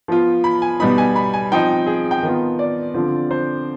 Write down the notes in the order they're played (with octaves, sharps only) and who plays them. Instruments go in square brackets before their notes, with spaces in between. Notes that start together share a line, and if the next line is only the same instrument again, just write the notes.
[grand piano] F3 B3 F4
B5
G#5
B2 G3 B3 D#4 B5
G#5
B5
G#5
F3 C4 D#4 G5
G#4
G5
D#3 B3 F4
D5
D3 F3 C4 F4
C5